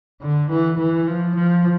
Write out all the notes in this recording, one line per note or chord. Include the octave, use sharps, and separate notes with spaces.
D3
E3
E3
F3
F3